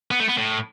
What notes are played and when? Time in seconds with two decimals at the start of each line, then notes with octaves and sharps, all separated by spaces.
0.11 B3
0.20 A3
0.28 B3
0.37 A2